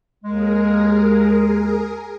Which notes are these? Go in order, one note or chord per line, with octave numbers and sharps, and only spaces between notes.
D#2 G#3 G#4 A#4